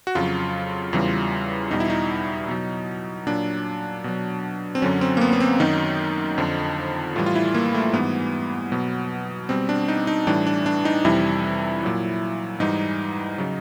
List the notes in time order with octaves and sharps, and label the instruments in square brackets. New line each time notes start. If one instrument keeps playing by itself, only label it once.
[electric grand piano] F#4
F2 C#3 F#3 F4
E2 C#3 E3 G3
E2 B2 G3 D#4
E4
D#4
B2 F#3
A#2 F#3 D4
B2 F#3
C4
F#2 D3 F#3 C#4
C4
A#3
B3
B3
C4
F#2 D#3 F#3 D#4
F2 D3 F3
A2 E3 G3 F4
F4
E4
A#3
A3
G#2 E3 G3 B3
B2 F#3
B2 G3 C4
D4
D#4
D#4
A2 E3 G3 D4
D4
D4
D#4
F2 C3 E3 G3 E4
A#2 F#3
G#2 E3 G3 D#4
C#3 F#3